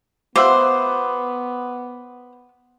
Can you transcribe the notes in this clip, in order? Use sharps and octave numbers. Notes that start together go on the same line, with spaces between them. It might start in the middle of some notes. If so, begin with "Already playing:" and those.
B3 F4 C5 E5 F#5 D6